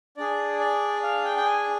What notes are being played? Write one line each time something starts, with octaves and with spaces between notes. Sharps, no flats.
D4 G#4 D5
D5
F5
G5
G5
G#5